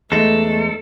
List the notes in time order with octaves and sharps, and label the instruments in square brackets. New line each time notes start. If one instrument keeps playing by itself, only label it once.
[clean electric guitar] E2 G#3 D#4 [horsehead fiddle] A3 [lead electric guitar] A4